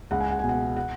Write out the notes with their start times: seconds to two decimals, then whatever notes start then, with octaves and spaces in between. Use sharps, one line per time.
0.11 C#2 F#5
0.20 G#5
0.30 F#5
0.39 B2 G#5
0.49 F#5
0.77 F#5